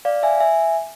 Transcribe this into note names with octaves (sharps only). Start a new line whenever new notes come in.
D5 F5
E5 G#5
E5 G#5